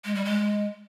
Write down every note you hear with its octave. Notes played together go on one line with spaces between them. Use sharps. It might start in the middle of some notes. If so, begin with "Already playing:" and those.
G#3
G3
G#3